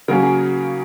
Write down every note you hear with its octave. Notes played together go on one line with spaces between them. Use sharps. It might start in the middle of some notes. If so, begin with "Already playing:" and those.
C#3 F#3 A#3 C#4 A#4
G#4